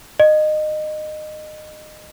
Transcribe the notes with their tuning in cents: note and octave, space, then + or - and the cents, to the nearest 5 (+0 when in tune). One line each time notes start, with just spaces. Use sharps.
D#5 -20